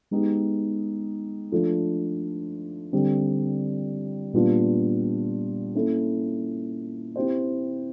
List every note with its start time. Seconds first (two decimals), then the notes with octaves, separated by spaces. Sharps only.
0.11 G#3 B3 D#4 G4
1.52 F3 A3 D4 F4 A4
2.93 D3 G3 C4
4.33 A#2 G3 B3 D4 F4
5.75 A#3 C#4 E4 A4
7.16 C4 E4 G4 C5